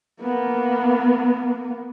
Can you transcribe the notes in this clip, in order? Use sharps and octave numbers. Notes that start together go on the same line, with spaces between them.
A#3 B3